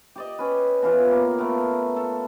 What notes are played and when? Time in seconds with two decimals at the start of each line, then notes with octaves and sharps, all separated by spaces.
0.16 G4 D5 D#5
0.39 C#4 B4
0.82 B2 E3 F4
1.11 A#3
1.39 A3 B3 A#4
1.96 A4